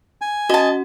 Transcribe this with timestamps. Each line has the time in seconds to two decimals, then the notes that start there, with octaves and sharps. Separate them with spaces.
0.21 G#5
0.49 C#4 F#4 D#5 A5